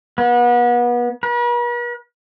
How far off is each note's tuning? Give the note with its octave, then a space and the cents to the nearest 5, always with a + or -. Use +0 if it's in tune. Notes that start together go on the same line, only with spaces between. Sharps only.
B3 -35
B4 -45